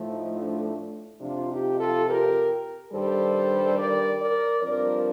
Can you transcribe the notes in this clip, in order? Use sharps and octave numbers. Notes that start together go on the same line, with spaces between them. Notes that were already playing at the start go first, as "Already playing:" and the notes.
Already playing: A2 F3 A3
D#4
D4
F2 C3 F3 D4 F4
D#4 G4
F4 A4
G4 A#4
G2 D#3 G3 A4 C5
A#4 D5
A#4 D5
G2 F3 C4 A#4 D5